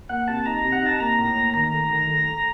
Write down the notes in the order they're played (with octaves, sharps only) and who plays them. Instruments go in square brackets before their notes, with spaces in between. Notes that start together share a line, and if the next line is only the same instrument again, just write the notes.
[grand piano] A#3 [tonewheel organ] F#5
[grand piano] C3 [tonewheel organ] A5
[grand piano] D#4 [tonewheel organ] A#5
[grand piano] C3
[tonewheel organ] F#5
[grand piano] D#4 [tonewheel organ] A5
[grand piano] A#3 [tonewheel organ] A#5
[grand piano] A2
A#3
[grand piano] D#3 [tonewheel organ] A#5
[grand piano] A3
D#3
A3
A3